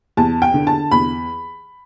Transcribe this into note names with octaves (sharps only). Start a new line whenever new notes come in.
E2 A5
G5
D3
A5
E2 B5